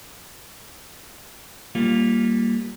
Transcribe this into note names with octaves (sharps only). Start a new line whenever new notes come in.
G3 A#3 F4